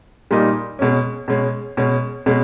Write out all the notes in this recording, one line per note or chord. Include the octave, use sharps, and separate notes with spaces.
A#2 G3 A#3 D#4
B2 G#3 C#4
B2 G#3 C#4
B2 G#3 C#4
B2 G#3 C#4